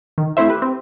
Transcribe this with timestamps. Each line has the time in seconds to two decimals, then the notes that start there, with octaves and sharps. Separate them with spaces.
0.18 D#3
0.37 A3 C4 E4 C5 E5
0.48 G4 B4
0.62 C4